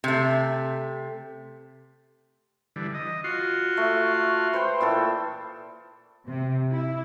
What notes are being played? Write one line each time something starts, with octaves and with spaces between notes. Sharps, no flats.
C3 A3
D3 E3 G3
D#5
F4 F#4 C6
A3
B4 C5 G5
A#2 E3 A4
C3
E4